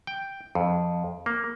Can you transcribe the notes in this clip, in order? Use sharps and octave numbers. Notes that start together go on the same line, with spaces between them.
G5
F2
A#3